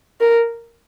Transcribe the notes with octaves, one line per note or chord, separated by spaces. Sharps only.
A#4